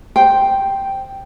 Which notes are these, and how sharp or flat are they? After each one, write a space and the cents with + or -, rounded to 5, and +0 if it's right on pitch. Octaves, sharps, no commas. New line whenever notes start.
C5 +5 G5 -5